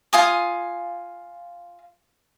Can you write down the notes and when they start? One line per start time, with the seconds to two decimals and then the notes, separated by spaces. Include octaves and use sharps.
0.13 F4 G#5 D#6